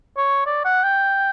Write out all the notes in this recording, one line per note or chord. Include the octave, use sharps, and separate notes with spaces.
C#5
D5
F#5
G5